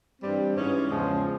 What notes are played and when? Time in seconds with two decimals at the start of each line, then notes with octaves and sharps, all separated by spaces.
0.22 G2 E3 G3 C4
0.56 G#2 E3 G#3 C#4
0.90 E2 C#3 F3 G#3 C#4